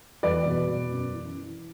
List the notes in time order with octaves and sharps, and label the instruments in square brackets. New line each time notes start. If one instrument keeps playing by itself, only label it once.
[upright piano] E2 B4 D5
B2
B2
F#2
E3
E3